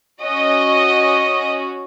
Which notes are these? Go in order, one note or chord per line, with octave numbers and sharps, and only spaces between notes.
C#4 F#4 D#5